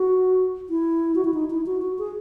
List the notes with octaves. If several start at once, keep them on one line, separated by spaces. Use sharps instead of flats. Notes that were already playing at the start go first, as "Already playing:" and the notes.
Already playing: F#4
E4
F#4
E4
D#4
E4
F#4
F#4
G#4